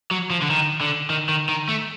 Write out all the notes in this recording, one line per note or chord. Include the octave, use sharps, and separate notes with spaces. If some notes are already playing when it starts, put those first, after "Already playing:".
F#3
F3
D3
D#3
D3
D#3
D#3
D#3
A3